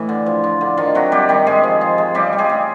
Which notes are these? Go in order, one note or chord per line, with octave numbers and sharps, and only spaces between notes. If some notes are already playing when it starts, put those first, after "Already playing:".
Already playing: A2 E3
D3
F3
F3
D3
D#3 F3 F4
C3 F#3 F#4
C3 G3 G4
D#3 G3 G4
G#2 G#3 G#4
F3
F3
G#3
C#3 G3 G4
G3
G#3 G#4
C#3